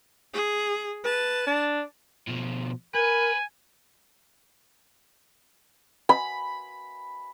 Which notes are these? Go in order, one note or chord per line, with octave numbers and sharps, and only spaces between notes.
G#4
B4 A5
D4
B2 F3
A#4 B4 G#5
B5